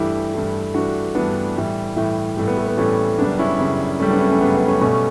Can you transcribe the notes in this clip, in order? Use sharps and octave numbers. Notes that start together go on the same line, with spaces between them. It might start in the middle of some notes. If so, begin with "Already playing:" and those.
Already playing: G2 E3 A3 E4 G4
G2 E3 A3
G2 E3 A3 D4 F#4
G2 E3 A3 B3 D4
A2 E3 G3
A2 E3 G3
A2 E3 G3 A3
B3
A3
B3
A2 E3 G3 A3 C#4
F#2 C#3 G3 B3 D4
C#4 E4
F#2 C#3 G3
F#2 C#3 G3 A3 C#4
B3 D4
A3 C#4
A3 C#4
F#2 C#3 G3 B3
B3
A3 C#4
B2 G3 A3 C#4